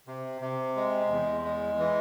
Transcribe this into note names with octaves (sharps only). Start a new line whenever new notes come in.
C3
C3
G#3
E2
G#3
E3